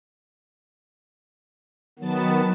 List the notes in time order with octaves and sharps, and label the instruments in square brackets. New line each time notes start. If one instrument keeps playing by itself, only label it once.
[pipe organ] D#3 B3 [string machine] F#3 A5